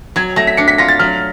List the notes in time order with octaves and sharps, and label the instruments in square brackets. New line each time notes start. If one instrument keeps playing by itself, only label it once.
[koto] F#3 [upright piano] G#6
[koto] A3 [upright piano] A#6
[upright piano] B6
[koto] D4 [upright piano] C#7
[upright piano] B6
[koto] F4 [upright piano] A#6
[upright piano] A6
[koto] F#3 [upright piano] F6